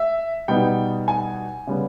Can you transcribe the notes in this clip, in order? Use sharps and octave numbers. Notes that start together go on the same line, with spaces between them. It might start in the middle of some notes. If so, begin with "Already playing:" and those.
Already playing: E5
B2 G3 B3 D#4 G5
G#5
C#3 G3 B3